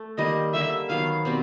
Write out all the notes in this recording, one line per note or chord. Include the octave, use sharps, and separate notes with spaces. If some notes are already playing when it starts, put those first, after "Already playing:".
Already playing: A3
D#3 G3 A#3 D#5
D3 G3 A#3 E5
D#3 F#3 B3 F5
B2 G3 C4